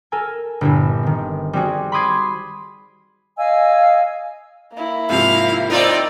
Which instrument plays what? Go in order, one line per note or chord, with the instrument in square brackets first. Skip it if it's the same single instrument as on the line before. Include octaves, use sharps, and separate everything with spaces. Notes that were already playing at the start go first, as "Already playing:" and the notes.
[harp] A4 A#4 G#5
G1 A#2 E4
D#3 C4
G3 C4 F#4 G#4
B5 C6 D6 D#6 G#6 C7
[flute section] D#5 F5 G#5 E6
[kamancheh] A#3 E4
[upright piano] G#2 C3 F3 [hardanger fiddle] F5
[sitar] C4 F4 A#4 [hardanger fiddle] D#4 D5